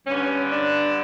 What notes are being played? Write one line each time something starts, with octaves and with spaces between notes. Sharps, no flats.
G2 D3 F#3 B3 C#4
D4